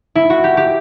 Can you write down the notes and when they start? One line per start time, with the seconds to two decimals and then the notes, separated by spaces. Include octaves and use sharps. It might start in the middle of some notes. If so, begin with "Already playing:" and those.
0.15 E4
0.30 F#4
0.44 G4
0.57 G4